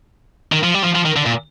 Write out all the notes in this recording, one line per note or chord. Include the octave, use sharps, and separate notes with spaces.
D#3
F3
G3
F3
F3
D#3
D3
A#2